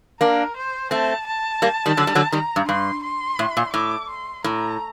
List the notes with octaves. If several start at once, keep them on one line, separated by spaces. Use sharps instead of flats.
A#3 D4 A#4
C5
A3 C4 A5
A5
G3 A#3
D#3 G3
D3 F#3
G3
D3 F#3
D#3 G3 A#5
G2
G2 C6
C6
A2
A#2
A2 D6
C6
A2 A#5